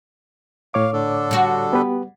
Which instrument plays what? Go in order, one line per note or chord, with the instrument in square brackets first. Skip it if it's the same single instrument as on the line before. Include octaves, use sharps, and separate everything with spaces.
[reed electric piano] A2 C#5 D6 [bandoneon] F5
[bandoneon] D3 D4 A4
[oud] G3 F#4
[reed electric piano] B3 G4 B4